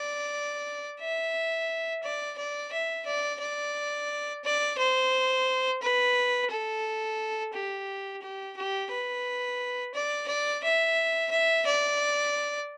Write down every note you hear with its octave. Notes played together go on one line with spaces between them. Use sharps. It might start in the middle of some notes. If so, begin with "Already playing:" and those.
Already playing: D5
E5
D5
D5
E5
D5
D5
D5
C5
B4
A4
G4
G4
G4
B4
D5
D5
E5
E5
D5